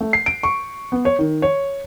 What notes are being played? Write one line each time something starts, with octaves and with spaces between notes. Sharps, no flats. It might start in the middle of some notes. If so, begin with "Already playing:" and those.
A3
C7
D7
C#6
B3
C#5
D#3
C#5